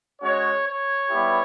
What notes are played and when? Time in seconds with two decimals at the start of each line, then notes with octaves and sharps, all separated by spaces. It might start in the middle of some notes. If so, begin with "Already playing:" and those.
0.22 G#3 C#4 F#4 C#5
0.65 C#5
1.09 G3 B3 E4 G4